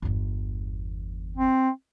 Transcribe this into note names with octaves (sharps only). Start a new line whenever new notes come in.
G1 E2
C4